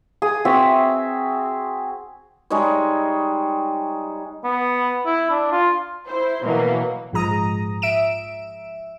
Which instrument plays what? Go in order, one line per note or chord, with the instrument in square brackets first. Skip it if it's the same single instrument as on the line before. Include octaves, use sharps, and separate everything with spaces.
[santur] G#4 D#6
C4 F#4 E5
[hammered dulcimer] G3 G#3 D#4 C#5
[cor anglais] B3
E4
D4
F4
[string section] E4 C5
B2 E3 F#3 A#3
[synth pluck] A#1 G#2 F3 G#3 A#5 D#6
E5 D7 E7